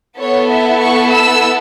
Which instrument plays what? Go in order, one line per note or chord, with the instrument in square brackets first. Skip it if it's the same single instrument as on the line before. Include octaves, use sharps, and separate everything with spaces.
[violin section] B3 E4 A4 C#5
E5
C#6
E6